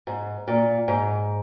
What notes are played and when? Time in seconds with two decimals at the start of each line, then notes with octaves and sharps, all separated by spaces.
0.07 G#2
0.48 A#2
0.88 G#2